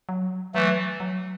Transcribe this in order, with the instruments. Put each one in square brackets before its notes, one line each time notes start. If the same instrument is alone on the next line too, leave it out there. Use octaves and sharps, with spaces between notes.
[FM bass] F#3
[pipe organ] E3 A3 [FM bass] F#3
[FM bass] F#3